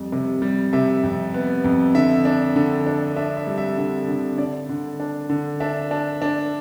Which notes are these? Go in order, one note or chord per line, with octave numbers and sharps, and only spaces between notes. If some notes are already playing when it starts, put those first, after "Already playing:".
Already playing: F2 G3
C3
G3
C3 E5
F2
B3
F2
D3 E5
D4
D3
D4
D4 E5
E5
G3
E5
D3
D3
D3 D5
D3
D4
D3
D4 E5
D4
D4